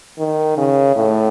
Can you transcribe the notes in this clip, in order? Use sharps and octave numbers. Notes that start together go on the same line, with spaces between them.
D#3
C#3
A2